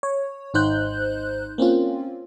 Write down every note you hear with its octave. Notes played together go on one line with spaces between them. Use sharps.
C#5
G#1 D#4 C5 F#6 G6
A#3 C4 C#4 F4